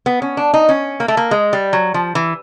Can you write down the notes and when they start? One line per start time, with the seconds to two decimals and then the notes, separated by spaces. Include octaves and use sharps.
0.06 B3
0.22 C#4
0.37 D4
0.54 D#4
0.69 C#4
1.00 A#3
1.08 A3
1.17 A#3
1.31 G#3
1.53 G3
1.73 F#3
1.94 F3
2.15 E3